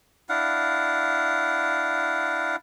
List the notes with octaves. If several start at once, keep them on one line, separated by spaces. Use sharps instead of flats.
D4 E4 F5 F#5